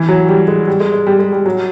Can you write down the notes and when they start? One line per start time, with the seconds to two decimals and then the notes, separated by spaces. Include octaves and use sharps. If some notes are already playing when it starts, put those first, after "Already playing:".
Already playing: E3
0.09 F#3
0.29 G3
0.48 G#3
0.68 G3
0.80 G#3
0.94 G#3
1.07 G3
1.19 G#3
1.32 G3
1.46 F#3